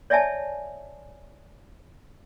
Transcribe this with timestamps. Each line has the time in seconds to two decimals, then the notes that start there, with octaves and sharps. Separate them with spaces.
0.10 C#5 D5 E5 G#5 A5